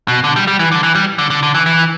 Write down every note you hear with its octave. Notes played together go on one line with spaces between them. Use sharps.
B2
D3
G3
G3
E3
D3
E3
G3
D3
D3
D3
E3
E3